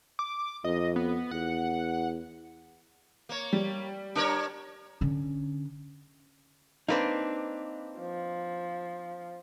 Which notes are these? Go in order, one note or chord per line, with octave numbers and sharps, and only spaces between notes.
D6
F2 D#5
B3
E2 F#5
A#3 C#5
G3
D4 A#4 C#5
D3 C#4
A#3 C4 D4 D#4 B4
F3